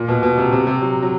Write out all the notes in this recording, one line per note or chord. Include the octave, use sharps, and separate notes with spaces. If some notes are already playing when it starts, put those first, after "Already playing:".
Already playing: A#2
B2
B2
C3
C3
C3
F#3
F#3